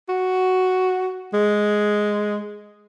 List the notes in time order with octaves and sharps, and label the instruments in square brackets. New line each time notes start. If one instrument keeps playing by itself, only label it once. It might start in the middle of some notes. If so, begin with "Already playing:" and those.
[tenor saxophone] F#4
G#3